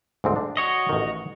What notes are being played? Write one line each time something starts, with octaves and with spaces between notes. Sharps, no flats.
D2 G#2 C4
D3 D4
F#4 C#5 D#5
A1 D#3